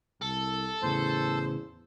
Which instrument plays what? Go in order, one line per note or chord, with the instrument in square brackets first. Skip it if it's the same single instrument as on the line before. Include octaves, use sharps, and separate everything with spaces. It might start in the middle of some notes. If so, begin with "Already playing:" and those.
[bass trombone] C2 [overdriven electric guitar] A4
[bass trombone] E2 [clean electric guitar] A2 C#3 [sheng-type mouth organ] C5